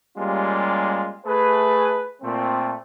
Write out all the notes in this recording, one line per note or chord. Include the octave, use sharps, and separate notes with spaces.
G3 G#3 A#3 C#4 F4 G4
A3 G#4 B4
A#2 A3 C4